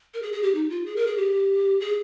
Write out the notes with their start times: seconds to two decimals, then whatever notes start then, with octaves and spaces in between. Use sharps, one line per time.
0.14 A#4
0.22 G#4
0.33 G#4
0.43 G4
0.55 D#4
0.70 F4
0.86 G#4
0.96 A#4
1.07 G#4
1.17 G4
1.80 G#4